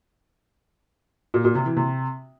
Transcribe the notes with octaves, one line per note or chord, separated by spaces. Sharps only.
A#2
A#2
C3
E3
C3